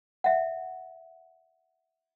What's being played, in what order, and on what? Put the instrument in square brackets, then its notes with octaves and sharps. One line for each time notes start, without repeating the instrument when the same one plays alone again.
[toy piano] E5 F#5